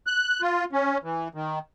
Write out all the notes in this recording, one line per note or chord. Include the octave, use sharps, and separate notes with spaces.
F#6
F4
C#4
E3
D#3